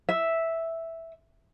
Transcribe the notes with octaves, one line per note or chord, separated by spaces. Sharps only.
E5